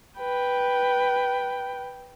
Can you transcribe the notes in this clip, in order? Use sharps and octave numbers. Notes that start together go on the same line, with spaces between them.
B4 G5